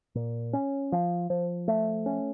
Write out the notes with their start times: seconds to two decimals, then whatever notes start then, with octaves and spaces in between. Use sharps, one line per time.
0.15 A#2
0.53 C#4
0.92 F3
1.30 F3
1.68 A3
2.06 C#4